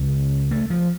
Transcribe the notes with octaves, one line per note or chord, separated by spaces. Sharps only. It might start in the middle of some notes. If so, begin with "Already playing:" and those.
Already playing: C#2 C#3 C#4
A3
F3